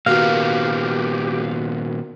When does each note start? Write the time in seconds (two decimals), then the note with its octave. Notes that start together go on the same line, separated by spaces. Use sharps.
0.06 A#2 D#3 B3 F#4 G4 A#4 F5